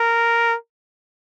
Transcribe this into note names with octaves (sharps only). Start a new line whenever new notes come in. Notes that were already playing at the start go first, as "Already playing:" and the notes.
Already playing: A#4